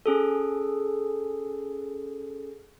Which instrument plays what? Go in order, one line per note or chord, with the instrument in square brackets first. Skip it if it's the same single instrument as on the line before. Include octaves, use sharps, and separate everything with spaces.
[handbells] C#4 G#4 A4